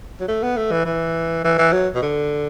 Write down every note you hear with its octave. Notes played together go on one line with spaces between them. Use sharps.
F#3
A3
B3
A3
E3
E3
E3
E3
F#3
B2
D3